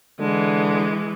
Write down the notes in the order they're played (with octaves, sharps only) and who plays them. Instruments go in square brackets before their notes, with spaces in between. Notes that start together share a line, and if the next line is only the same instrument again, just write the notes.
[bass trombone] D3 [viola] E3 G#3